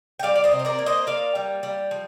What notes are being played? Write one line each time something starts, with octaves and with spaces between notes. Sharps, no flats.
G5
G3 D5 F5
D5
C5 D#5
C3
D#5
A#4 D5
A#3
C5 D#5
A#3 D5 F5
G3
G3
F3